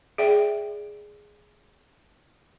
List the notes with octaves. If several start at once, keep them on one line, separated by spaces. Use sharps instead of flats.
G#4 D5 E5 G5